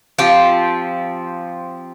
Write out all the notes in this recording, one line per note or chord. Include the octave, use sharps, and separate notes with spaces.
F3 C4 G4